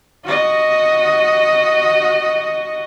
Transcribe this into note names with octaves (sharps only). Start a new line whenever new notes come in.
F#4 D#5